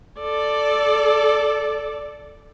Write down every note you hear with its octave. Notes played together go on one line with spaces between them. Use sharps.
A4 D5